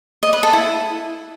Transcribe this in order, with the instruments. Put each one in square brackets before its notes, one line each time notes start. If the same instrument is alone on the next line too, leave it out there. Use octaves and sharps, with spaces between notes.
[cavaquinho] D#5
B4
A4
E4